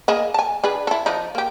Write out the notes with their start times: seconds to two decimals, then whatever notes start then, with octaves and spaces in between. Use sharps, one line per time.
0.08 A#3 G#4 D#5
0.34 G#5 A5
0.64 D4 G#4 B4
0.87 E4 A4
1.06 F3 D4 D#4
1.35 A#3 G4